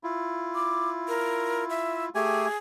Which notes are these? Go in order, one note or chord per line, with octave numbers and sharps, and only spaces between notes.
E4 F4
D6
A#4
E5
A3 G4 G#4 G#5